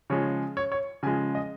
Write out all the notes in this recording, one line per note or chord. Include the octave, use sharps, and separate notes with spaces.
C#3 F3 G#3 C#5
C#5
C#5
C#3 F3 G#3 G#5
D#5